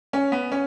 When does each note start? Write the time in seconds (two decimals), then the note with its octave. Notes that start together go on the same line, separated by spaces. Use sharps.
0.13 C#4
0.32 B3
0.52 C#4